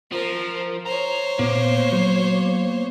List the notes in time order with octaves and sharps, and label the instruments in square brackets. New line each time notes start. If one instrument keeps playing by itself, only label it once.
[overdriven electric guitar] F3 [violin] A#4 C5
[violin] C5 C#5 [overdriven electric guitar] A#5
[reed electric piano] A#2 [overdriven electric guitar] A#3 [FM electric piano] B3
[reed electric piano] F#3